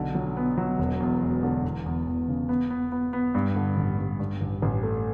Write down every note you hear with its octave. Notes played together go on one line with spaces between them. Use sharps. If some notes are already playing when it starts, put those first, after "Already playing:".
Already playing: B1 D3
F#3
B3
F#3
E1
E2
E1
D3
E2
E2
E2
C#3
B3
B3
B3
B3
G2
D3
A1
G2
G2
A1
A1
A3